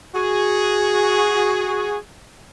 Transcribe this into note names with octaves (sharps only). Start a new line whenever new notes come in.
F#4 G#4